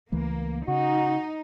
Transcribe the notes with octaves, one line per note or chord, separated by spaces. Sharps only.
C#2 E3 A3 A#3
C#3 D#4 F#4